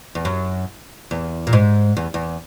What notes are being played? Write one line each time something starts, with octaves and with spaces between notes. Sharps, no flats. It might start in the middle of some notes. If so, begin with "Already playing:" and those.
E2
F#2
E2
A#2
G#2
E2
E2